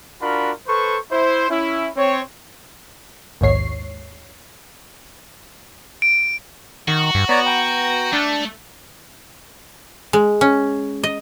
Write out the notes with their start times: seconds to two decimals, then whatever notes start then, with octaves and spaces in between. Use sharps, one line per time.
0.22 D4 F4 F#4 A#4 B5
0.68 A4 B4 C5 C#6
1.11 E4 C5
1.50 C#4 E4
1.97 C4 C#5
3.41 A#1 D#2 G#2 C#5 C7
6.02 D7
6.88 D#3 F#4
7.15 G2
7.29 B3 C#5 D5 A#5
7.46 G5 A#5
8.13 A3 D4
10.13 G#3
10.41 C#4
11.03 D#5